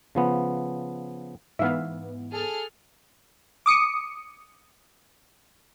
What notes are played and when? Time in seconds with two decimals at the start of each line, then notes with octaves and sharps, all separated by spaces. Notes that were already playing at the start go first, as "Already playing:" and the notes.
0.15 C#3 F3 B3
1.59 G#2 E3 B3 E5 F5
2.33 G#4 A4 F6
3.66 D6 D#6 C#7